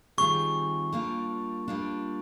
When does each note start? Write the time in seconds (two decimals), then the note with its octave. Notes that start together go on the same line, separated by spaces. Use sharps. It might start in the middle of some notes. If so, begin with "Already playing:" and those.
0.18 D#3 G3 C4 F4 G#4 C#6
0.92 G3 A#3 D4 F4
1.68 G3 A#3 D4 F4